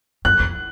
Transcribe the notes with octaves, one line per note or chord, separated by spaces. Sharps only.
F#2 F#6
F2